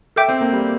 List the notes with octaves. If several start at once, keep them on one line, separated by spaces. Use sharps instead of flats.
A4 E5 G5 D6 G6
C4
A#3
G3